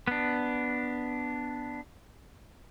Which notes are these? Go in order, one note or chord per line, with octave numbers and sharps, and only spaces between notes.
B3 D4